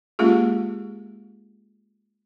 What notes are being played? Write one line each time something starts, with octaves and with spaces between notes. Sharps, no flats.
G#3 A#3 C#4 F4 G4 G#4